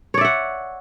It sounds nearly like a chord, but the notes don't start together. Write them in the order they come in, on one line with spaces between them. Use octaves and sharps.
C#5 D5 E5 F#5